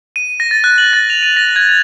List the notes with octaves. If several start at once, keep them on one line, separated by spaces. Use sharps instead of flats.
D#7
A#6
A6
F#6
F#7
A6
F7
D#7
A#6
G#6
F7